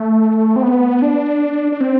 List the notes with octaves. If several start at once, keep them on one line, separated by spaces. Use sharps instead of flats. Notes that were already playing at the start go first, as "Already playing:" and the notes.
Already playing: A3
C4
B3
D4
D4
C4